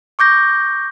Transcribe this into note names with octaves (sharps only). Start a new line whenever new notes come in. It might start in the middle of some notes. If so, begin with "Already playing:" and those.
C#6 D6 G6 A#6